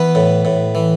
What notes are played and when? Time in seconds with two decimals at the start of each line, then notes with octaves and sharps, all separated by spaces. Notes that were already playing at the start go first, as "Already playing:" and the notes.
Already playing: E3 B3 B4
0.15 A2
0.45 A2
0.75 E3